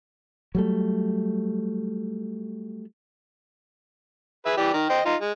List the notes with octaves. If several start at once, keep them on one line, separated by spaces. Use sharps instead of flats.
F#3 G3 A3
G#4 B4 E5
E3 G4 D5
D#3 A#4
C5 D#5 G5
D#4 F4
G#3